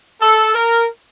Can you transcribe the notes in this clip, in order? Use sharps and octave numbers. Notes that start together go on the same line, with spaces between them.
A4
A#4